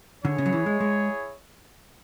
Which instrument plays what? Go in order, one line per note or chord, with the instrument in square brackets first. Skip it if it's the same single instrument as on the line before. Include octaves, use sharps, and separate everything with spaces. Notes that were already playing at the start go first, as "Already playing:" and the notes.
[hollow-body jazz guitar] D3 [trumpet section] E4 G#4 C#5
[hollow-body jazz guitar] C#3
F#3
E3
G#3
G#3